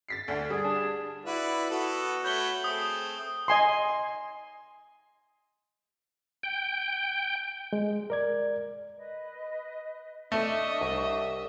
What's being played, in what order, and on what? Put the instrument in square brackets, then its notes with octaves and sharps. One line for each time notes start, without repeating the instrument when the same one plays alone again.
[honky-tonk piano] A6 B6 C7
[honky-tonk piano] D2 [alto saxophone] D3
[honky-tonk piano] G3 [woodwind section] G#4
[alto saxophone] D4
[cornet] E4 [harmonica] F#4 B4 D5
[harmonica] B3 A4 [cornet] F#4
[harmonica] A3 C#5 B5 [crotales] G6 G7
[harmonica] A3 C4 G#4 [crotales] D#6
[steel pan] D#5 G#5 C6
[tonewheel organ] G5
[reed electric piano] G#3
A#4 D5 G#6
[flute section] B4 D#5
[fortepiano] A3 [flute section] D4 C#6 [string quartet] D#5 E5
[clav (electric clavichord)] C2